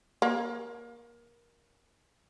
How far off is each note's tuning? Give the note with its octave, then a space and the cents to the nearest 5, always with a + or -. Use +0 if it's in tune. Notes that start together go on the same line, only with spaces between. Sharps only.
A#3 +20